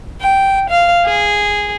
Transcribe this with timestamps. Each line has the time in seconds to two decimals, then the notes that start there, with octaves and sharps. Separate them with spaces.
0.20 G5
0.69 F5
1.04 G#4